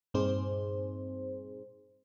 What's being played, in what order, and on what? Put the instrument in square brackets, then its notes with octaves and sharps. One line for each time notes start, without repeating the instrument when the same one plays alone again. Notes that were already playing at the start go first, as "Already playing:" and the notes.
[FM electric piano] G2 A#2 C4 D#4 G#4 C5